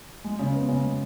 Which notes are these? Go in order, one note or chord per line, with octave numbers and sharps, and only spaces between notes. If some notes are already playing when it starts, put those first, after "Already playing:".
G#3
C#3
B3
C#3
G#3